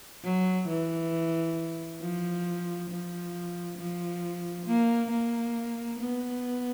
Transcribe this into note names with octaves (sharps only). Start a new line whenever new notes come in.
F#3
E3
F3
F3
F3
A#3
A#3
B3